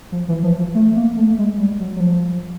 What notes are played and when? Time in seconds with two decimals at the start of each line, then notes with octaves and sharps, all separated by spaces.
0.12 F3
0.28 E3
0.43 F3
0.59 F3
0.75 A3
0.96 A#3
1.17 A3
1.38 G#3
1.59 G3
1.80 F#3
1.96 F#3
2.00 F3